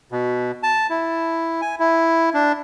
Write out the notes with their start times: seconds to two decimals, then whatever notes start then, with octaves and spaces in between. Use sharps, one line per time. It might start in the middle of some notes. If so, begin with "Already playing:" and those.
0.12 B2
0.63 A5
0.90 E4
1.61 G#5
1.80 E4
2.34 D4